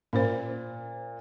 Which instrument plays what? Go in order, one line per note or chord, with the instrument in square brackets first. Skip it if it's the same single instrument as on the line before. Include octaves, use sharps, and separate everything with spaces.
[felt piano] A#2 [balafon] C#4 C5